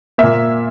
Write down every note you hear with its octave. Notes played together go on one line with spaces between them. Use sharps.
A#2 A#3 E5